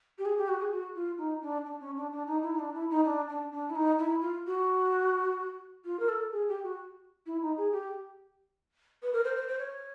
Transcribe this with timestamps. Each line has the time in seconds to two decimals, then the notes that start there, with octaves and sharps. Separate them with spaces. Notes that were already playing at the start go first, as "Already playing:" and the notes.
0.18 G4
0.25 G#4
0.37 G4
0.48 F#4
0.59 G#4
0.71 F#4
0.95 F4
1.17 D#4
1.41 D4
1.65 D4
1.80 C#4
1.96 D4
2.12 D4
2.27 D#4
2.42 E4
2.53 D#4
2.59 D4
2.74 E4
2.90 D#4
3.04 D4
3.29 D4
3.52 D4
3.69 E4
3.75 D#4
3.98 E4
4.21 F4
4.46 F#4
5.85 F4
5.99 A#4
6.08 A4
6.32 G#4
6.48 G4
6.63 F#4
7.26 E4
7.41 D#4
7.57 G#4
7.72 G4
9.02 B4
9.12 A#4
9.24 C5
9.36 C5
9.48 C5
9.58 C#5